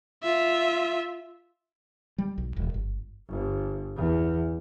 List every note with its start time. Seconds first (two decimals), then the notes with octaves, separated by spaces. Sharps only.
0.23 F4 E5
2.18 G3
2.38 B1
2.56 E1
2.74 G1
3.28 G1
3.96 E2